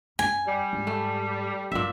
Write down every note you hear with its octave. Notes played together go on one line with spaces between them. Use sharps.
F#2 C#4 G#5
G3
G#2
A3
G1 A#2 F#3 E5